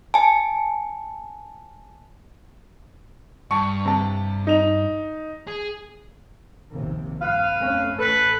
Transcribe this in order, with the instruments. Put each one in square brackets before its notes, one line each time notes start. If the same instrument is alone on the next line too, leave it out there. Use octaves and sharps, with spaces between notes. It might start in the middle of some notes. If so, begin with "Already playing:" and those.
[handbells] G#5 A5
[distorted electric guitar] G2 [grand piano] A5 C#6
[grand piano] C3 A5
D#4 F7
[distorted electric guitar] G#4
[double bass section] A#1 D#2 C3
[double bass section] G2 [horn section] B4 F5
[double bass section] F1 A3 C#4
[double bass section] A1 [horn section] A4 B4